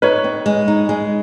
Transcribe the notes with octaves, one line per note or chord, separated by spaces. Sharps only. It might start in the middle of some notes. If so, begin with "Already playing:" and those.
D#4 B4 C#5
C4
G#3
D#4
G#3